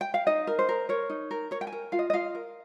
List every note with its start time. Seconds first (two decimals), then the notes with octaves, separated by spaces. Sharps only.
0.01 G5
0.14 F5
0.27 D#4 D#5
0.47 A#4
0.59 C5
0.69 A#4
0.89 A#4 C#5
1.10 D#4
1.31 A#4
1.51 A#4 C#5
1.61 G5
1.67 G#5
1.72 A#4
1.92 F4 F5
1.99 D#5
2.10 D#5
2.13 F4 F5
2.35 A#4